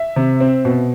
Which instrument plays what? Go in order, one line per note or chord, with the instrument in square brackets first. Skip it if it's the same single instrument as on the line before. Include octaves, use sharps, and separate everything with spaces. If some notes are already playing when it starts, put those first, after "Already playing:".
Already playing: [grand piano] E5
C3
C4
B2